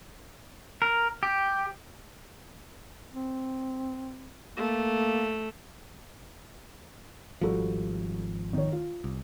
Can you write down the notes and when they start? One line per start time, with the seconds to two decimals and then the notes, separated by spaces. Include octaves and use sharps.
0.82 A#4
1.23 G4
3.13 C4
4.57 A3 A#3
7.41 G#1 F3 G3 F#4 A4
8.53 D#3 C#5
8.72 F4
9.04 C2